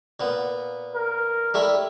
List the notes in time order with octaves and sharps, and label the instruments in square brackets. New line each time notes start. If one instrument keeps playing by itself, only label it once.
[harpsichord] A#2 B3
[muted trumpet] A#4
[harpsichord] G3 A3 E4